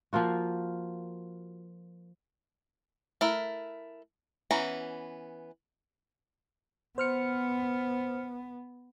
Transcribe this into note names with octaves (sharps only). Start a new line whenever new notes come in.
F3 A#3 F4 F#4
A3 E4 A#4
E3 B3 C#4 A#5
B3 C5 F6 C#7